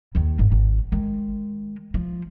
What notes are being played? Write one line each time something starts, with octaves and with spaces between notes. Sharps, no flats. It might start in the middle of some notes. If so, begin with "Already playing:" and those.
D#2 D#3
G#1
G#1
D#3 G#3
F3